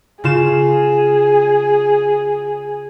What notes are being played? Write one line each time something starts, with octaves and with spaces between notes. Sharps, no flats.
C#3 F4 G#4 E7